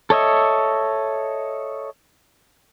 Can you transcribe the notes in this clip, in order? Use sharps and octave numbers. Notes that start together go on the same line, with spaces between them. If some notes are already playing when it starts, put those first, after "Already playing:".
A4 C#5 D#5 E5